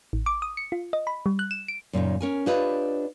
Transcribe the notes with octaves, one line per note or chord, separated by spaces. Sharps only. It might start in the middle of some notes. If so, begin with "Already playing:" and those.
A1
D6
D#6
C#7
F4
D#5
B5
G3
F#6
E7
D7
F#2 A#2 C#3 D#4
C#4 A#4 G#5
D4 F4 G4 B4 C#5 D#5